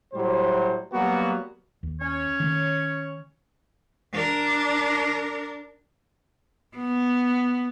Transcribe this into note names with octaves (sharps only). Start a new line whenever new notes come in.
A2 F#3 G3 C5
F#3 G3 A#3 B3 F#4
D#2
C#4 C#5
D#3 A3
D4 A#4
B3